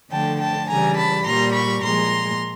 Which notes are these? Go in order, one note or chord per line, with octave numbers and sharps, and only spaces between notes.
D3 F3 A3 G5 A5
G5 A5
C#3 E3 G3 G#5 A#5
A5 B5
A#2 G3 A#5 C6
B5 C#6
A#2 F3 G#3 A#5 C6